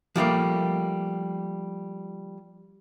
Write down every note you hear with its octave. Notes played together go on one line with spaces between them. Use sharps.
F3 G3 A3 A#3